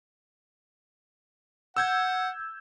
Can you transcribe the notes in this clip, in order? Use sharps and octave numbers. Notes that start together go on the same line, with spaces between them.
F#5 E6 G6 G#6